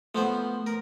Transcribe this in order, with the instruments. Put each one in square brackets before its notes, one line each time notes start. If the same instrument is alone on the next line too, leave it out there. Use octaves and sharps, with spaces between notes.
[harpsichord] F3 B3 C5 [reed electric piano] A3
[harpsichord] A#4